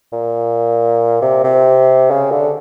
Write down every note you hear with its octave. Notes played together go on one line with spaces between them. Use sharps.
A#2
C3
C3
C#3
D3